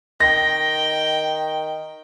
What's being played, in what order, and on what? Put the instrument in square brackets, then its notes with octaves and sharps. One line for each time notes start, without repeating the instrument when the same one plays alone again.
[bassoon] D#3 [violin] G5 [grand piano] A#6